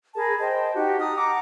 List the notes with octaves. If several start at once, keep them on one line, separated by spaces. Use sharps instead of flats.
G#4 A#4 A5 B5
C5 D#5 G5 A5
D#4 F#4 G4
A5 A#5 D#6 F6
F#5 A#5 D6